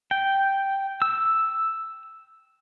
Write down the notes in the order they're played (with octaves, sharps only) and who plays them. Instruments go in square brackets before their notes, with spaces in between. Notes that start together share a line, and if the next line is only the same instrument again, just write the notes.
[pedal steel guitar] G5
E6